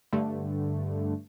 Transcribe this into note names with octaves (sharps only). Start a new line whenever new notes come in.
G2 D3 A3